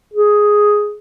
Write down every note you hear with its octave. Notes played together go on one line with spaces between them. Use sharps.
G#4